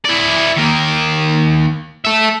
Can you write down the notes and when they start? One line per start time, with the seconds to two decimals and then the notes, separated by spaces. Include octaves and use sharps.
0.05 E4 D5
0.57 D#3 A#3
2.05 A4 E5